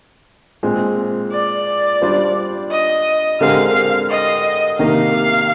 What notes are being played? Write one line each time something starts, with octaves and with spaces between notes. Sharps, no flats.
A#2 G#3 C4
D5
G3 D4 F4 C5
D#5
D3 G#3 C4 G4 A#4 F5
D#5
C3 D#3 A#3 F5